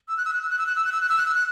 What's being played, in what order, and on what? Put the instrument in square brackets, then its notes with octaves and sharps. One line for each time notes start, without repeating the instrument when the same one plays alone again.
[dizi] E6
F#6
E6
F#6
E6
F#6
E6
F#6
E6
F#6
E6
F#6
E6
F#6
E6
F#6